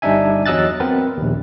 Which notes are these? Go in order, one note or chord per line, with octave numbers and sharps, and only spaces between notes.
G1 G3 D4 D#4 E5 G#5
E2 F#3 D#5 E6 F#6 A6
B3 C4 A#4 B4
A#1 D#2